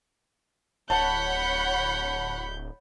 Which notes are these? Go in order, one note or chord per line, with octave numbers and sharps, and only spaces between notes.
D1 C#5 F#5 A5 B5 G6